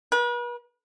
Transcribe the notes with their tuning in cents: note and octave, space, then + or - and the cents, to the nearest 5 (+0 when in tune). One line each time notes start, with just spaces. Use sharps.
B4 -40